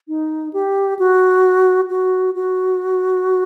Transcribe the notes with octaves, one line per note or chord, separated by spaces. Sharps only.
D#4
G4
F#4
F#4
F#4